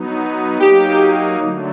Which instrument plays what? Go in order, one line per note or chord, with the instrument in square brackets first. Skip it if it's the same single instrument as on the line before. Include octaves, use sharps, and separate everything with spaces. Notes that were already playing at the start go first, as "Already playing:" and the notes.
Already playing: [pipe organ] F#3 B3 D#4
[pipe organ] F#3 A#3 D#4 [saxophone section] G4
[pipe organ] D3 F#3 A3